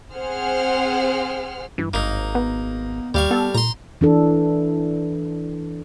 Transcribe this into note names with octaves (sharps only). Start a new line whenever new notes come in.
C4 G#4 C5 F#5 F6
G2 E3
G#1 A#3 D#4
B3
D#2 G3 F5 C#6
B3 A4
A#2 A#5 C6
E3 D4 A4